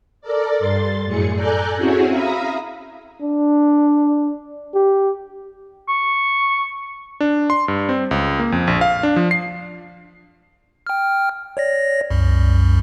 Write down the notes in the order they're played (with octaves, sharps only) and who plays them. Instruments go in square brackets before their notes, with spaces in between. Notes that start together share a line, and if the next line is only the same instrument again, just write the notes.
[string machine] A4 A#4 D5
G2 C6 A6
F#2 A2 G#4 C#7
A4 D5 G#5 A#5 F#6 G6
C4 C#4 E4 F#4 G#4 C#5
E5 F5 A#5 B5 D#6
[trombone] D4
G4
[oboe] C#6
[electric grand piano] D4
C6
G2
C4
C#2
A#3
F2
A#1
F5
D4
F3
C7
[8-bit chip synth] G5 F6
C#5 D5 A#6
C2 F#2